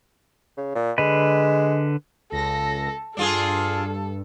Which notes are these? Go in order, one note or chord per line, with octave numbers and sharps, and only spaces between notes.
C#3
A#2
D3 G#3 B4
C#2 A4 A#6
G2 D4 F4 G#4 A4